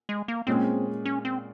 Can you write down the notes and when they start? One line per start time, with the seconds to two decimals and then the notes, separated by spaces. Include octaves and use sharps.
0.09 G#3
0.28 A#3
0.47 A#2 G#3 C4 C#4 G#4
1.05 C#4
1.25 C4